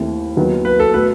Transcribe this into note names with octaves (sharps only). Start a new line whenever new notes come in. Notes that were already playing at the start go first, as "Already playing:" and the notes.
Already playing: D#2 D#3 A3 C4 E4
D#2 D#3 F#3 B3
B4
A4
B2 A3 B4